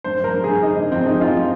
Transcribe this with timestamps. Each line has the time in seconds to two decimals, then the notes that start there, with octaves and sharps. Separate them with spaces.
0.04 G2 C5
0.20 G2 A#4
0.34 G2
0.44 G2 G#4
0.62 D3 D#4
0.77 G2
0.92 F3 C4
1.06 G2 D#4
1.21 G2 F4
1.35 F3